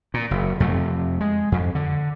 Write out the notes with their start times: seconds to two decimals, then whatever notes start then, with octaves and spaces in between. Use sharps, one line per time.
0.14 A#2
0.31 F#1
0.60 F2 C3 A3
1.21 G#3
1.52 F2
1.75 D3